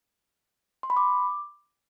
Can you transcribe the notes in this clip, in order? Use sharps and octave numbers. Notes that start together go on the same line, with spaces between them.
C6
B5
D6